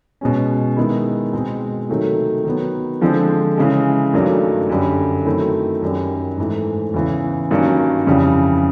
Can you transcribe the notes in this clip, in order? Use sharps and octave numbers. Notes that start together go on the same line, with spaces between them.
B2 G#3 C#4
D#3 G#3 B3 E4
B2 G#3 C4
C3 D#3 F#3 A3
D#3 F#3 B3
D3 F3 G#3 C4
C#3 E3 G#3
G2 D#3 F#3 A3 D4
F#2 D3 G3
D#3 F#3 A3 C4 E4
F#2 D#3 G3
G#2 E3 A3
E2 C#3 E3
G2 D#3 F#3 A#3 C#4
F2 C#3 E3 G3